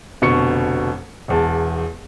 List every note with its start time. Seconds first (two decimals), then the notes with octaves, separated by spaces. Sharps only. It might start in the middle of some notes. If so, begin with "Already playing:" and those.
0.22 F1 B2 D3 C#6 C#7
1.28 E1 E2 A5